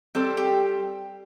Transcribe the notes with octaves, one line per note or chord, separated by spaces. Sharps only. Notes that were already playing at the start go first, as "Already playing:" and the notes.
G3 C4 A4 C5
G4